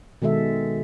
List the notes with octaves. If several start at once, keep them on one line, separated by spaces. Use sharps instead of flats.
B2 D#3 G#3 A4 E5